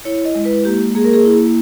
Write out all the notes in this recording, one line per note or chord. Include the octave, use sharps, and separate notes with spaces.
E4 C#5
D#5
G#3
B4
A#3 G4
A#3 G#4
A#4
G#4
E4